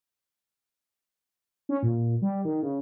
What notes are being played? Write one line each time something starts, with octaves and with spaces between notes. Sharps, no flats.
C#4
A#2
G3
D#3
C#3